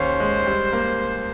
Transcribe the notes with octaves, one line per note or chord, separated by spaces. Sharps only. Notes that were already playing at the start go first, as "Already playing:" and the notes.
Already playing: D#2 C#4 C5
G#3
G3
A#3